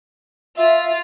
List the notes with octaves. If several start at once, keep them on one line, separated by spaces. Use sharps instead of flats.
F4 E5